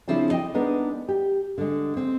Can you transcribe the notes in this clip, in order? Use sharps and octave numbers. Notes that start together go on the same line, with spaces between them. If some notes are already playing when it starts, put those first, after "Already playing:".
C#3 F3 C4 D4 E4 G#4
D#5 G5
G#3 B3 D4 D#4 G#4 A#4
G4
D3 G#3
C4